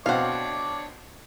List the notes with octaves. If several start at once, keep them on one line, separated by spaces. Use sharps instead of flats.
B2 C4 D4 C#5 F5 F#5 D6